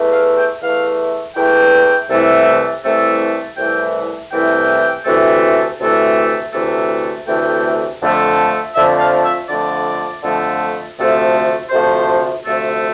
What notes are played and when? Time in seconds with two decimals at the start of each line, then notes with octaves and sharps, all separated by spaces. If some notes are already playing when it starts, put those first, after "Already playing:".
Already playing: E2 E3 A3
0.12 F5
0.37 G5
0.61 E2 E3 A3 F5
1.35 E2 E3 A3 G5
2.09 C2 C3 E3 A3
2.83 C2 C3 E3 A3
3.57 C2 C3 E3 A3 G5
4.31 C2 C3 E3 A3 G5
5.05 D2 C3 E3 A3
5.79 D2 C3 E3 A3
6.53 D2 C3 E3 A3
7.26 D2 C3 E3 A3 G5
8.01 F2 D3 F3 A3
8.74 F2 D3 F3 A3 E5
8.99 F5
9.23 E5
9.48 F2 D3 F3 A3 D5
10.22 F2 D3 F3 A3
10.97 D2 C3 F3 A3
11.70 D2 C3 F3 A3 C5
12.45 D2 C3 F3 A3